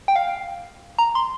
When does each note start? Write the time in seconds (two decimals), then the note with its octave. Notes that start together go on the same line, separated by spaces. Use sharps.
0.08 G5
0.16 F5
0.99 A#5
1.15 C6